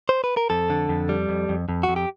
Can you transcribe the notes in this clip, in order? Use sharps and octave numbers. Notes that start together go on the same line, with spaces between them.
C5
B4
A#4
F2 A4
D3
F2
G3
F2
F2
F2
F#4
F2
G4